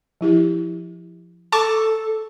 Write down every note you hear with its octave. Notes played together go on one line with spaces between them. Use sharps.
F3 E4 G4
A4 A5 C#6 D6